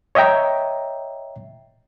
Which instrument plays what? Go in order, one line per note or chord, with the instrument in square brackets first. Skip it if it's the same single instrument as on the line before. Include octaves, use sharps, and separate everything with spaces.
[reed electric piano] C#5 D#5 E5 G5 A#5